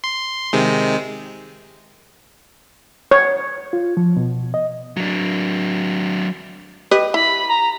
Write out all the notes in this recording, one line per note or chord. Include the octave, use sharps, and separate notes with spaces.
C6
C3 D#3 G#3
C#5
F4
F3
B2
D#5
F#3 D4
G4 B4 D#5
E4 B5
A#5